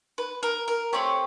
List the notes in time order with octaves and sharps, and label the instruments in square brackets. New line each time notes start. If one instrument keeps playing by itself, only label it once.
[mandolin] B4
A#4
A#4
A3 C4 G4 C#5